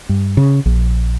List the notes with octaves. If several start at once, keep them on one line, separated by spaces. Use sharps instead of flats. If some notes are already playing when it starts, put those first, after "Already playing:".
G2
C#3
A#1